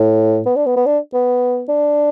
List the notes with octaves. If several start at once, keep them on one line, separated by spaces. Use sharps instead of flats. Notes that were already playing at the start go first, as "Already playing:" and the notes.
Already playing: A2
B3
D4
B3
B3
D4
B3
D4